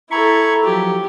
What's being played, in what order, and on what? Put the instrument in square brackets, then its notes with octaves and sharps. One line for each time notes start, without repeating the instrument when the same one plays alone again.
[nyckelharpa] E4 A4 [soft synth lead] A#5 [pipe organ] B5 C#6 G#6
[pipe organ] F3 F#3 [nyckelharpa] G4